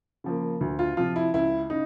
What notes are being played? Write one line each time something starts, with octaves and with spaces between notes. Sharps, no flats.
C#3 F3 A#3
D2
F4
C3 F3 F4
E4
C#2 E4
C#3 D#4